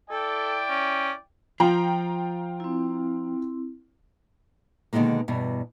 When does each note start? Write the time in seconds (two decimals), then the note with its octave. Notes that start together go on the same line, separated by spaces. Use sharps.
0.11 E4 A4 D5 G5
0.69 C#4
1.60 F3 F4 G5 A#5
2.60 C4 E4
4.93 B2 D3 D#3 F#3 G#3 A#3
5.28 E2 G2 B2 D4